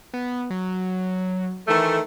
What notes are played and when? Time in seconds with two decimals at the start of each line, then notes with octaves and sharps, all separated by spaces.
0.14 B3
0.50 F#3
1.68 D#3 E3 A3